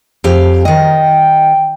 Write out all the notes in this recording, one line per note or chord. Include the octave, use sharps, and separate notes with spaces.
F2 G4 F5
D#3 D#5 G5